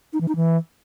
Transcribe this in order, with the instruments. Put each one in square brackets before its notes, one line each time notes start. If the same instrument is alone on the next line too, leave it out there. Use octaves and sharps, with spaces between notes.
[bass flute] D#4
E3
D#4
E3